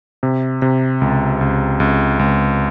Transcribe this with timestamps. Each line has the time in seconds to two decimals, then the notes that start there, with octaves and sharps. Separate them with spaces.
0.23 C3
0.62 C3
1.01 C#2
1.41 C#2
1.80 C#2
2.19 C#2